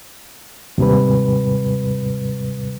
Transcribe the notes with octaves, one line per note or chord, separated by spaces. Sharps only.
D#2 G#2 C3 G3 B4